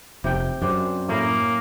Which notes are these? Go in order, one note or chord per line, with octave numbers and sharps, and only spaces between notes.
F1 C3 G5
F#2 C4 D4
A2 A#3 C#4